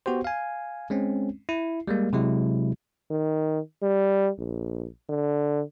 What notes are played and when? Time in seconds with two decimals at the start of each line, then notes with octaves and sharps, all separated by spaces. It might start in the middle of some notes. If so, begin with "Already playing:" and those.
0.06 B3 F#4 G4 C5
0.25 F5 G#5
0.90 G#3 C4 C#4
1.49 E4
1.87 G3 G#3 A#3
2.13 C3 F#3 G#3 E4
3.11 D#3
3.83 G3
4.39 A#1
5.09 D3